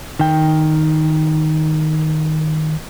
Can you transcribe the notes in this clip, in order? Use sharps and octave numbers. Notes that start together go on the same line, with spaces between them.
D#3 G5